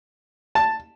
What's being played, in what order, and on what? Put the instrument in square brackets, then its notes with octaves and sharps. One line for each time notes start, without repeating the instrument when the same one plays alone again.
[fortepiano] A5